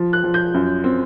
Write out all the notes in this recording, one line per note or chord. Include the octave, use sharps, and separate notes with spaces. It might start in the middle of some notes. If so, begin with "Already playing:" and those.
Already playing: F3
F#6
F3
G6
F#2
C4